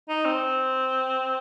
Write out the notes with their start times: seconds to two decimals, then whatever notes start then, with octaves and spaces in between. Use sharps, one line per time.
0.09 D#4
0.25 C4